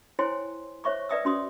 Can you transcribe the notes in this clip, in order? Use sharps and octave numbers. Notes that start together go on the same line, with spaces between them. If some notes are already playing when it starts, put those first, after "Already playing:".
E4 C5 C#5 G5 G#5 C6
C5 C#5 E5 C#6 D6
B4 D5 E5 G5 D#6 E6
C#4 F#4 C6 D6 D#6